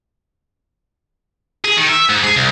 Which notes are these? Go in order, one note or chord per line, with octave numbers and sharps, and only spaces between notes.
G#4
D#3
E5
G#2
G#4
C2